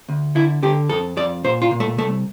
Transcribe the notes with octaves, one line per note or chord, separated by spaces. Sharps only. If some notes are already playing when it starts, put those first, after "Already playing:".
D2
D3 E4
D3 G4
F2 A4
F2 D5
A#2 C5
F4
A#2
A3
C2 A3